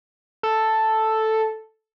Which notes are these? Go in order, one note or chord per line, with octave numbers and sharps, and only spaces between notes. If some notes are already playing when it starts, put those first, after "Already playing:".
A4